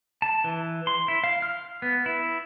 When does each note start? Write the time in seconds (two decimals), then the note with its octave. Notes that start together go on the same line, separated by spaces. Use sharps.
0.22 A5
0.44 E3
0.87 C6
1.08 E4
1.24 F5
1.42 F6
1.82 B3
2.06 E4